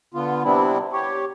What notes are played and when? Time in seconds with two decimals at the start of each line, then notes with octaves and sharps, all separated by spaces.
0.14 D3 B3 F4
0.44 C3 G3 B3 C4 D4 E4
0.92 G4 C#5